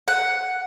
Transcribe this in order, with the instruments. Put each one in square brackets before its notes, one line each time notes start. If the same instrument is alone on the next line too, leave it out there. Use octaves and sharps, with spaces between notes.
[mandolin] F#5